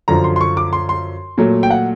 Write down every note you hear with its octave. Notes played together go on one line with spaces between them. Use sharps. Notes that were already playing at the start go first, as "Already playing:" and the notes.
F#2 D3 F3 A#5
C6
C6
C#6
D6
C6
C6
A#2 F#3 A3
G5
F#5